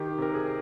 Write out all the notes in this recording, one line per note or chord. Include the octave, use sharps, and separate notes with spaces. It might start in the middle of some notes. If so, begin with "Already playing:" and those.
Already playing: D#3 G4
C3 A#4
G#4